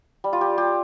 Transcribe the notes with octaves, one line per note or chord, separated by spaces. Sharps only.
G3
F4
G4
F4 G4